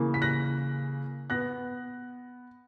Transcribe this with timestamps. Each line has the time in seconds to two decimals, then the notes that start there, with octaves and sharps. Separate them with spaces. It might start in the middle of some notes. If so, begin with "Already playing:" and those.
Already playing: C#3 E3 A#3
0.14 B6
0.22 F#6 A#6
1.30 B3 F#6 A#6